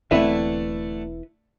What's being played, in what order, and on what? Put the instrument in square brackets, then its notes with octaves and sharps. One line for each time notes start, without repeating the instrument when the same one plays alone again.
[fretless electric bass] E1 E2 C4 [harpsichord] D3 A3 [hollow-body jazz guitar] E4 B4 E5